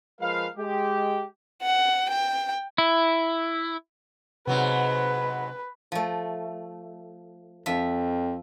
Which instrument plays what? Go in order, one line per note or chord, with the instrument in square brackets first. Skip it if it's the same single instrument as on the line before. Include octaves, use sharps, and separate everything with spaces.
[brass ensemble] F3 G#3 A#4 B4 F5
G#3 G4
[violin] F#5
G5
[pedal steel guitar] E4
[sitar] G#2 F#3 B3 [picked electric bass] C3 [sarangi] B4
[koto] F3 A3
[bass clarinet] F2 [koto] F3 E5